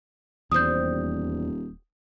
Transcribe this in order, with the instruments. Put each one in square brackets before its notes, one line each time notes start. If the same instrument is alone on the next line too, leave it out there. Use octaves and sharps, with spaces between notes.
[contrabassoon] D#1 [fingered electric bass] E2 [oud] G3 C4 [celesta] D#6 G6